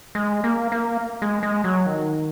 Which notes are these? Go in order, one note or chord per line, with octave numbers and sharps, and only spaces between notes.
G#3
A#3
A#3
G#3
G#3
F#3
D#3